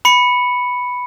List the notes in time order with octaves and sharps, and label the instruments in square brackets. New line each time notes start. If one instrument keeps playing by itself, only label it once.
[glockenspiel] B5 C#7